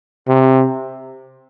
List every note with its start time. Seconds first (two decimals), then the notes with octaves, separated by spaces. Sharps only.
0.28 C3